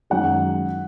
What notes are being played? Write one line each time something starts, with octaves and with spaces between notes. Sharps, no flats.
F#2 D#3 G#3 F#5